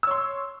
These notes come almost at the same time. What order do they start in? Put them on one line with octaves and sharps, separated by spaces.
E6 C#5 C6